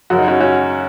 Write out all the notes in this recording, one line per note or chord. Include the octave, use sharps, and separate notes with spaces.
F#2 C#3 F#4
D#4
C#4 F#4
C#4 F#4